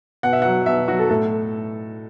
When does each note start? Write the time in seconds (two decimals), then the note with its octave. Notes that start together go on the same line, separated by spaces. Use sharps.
0.23 B2 F#5
0.33 E5
0.42 F#5
0.45 F#3
0.66 B2 E5
0.88 F#3 F#4
0.99 A4
1.09 A2 A4